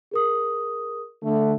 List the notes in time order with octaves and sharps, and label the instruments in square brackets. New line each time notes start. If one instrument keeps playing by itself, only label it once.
[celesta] G#4 A#4 D#6
[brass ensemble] D3 A3